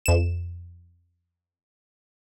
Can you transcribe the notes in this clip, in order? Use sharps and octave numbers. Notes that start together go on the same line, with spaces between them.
F2 E7